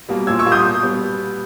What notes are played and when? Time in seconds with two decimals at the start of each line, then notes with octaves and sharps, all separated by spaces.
0.09 B2 G3 A#3
0.27 A#2 E6 G#6
0.39 C#6 E6
0.46 G3 A#3
0.52 D#6 G6
0.65 B2
0.83 G3 B3